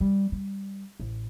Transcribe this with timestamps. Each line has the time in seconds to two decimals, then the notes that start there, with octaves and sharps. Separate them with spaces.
0.01 G3
0.32 G3
1.00 A1